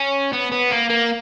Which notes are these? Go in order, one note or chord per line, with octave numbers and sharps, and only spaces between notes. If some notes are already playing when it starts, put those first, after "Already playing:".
Already playing: C#4
B3
B3
A#3
A#3